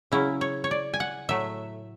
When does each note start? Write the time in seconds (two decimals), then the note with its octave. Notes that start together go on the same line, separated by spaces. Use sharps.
0.12 C#3 F#3 C#4 E4
0.41 C#5
0.64 C#5
0.71 D5
0.94 G#5
1.00 F#5
1.29 A2 F#3 A3 E5